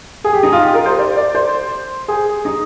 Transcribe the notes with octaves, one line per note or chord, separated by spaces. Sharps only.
G#4
G4
D#4
F4
G4
A#4
C5
D5
D5
C5
G#4
D#4